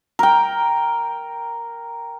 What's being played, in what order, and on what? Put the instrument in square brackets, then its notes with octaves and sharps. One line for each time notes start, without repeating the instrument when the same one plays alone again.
[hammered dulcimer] A#4 G5